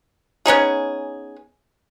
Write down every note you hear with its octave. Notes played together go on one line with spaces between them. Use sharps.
B3 C#4 D#4 G#4